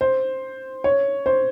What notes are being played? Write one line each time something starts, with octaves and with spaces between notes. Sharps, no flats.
C5
C#5
C5